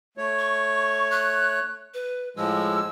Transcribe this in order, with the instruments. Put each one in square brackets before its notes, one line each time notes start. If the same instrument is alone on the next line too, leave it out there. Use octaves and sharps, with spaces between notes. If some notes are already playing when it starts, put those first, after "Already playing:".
[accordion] A3 C#5
[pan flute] C#6
F#6
B4
[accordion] A2 F3 G#3 [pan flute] E6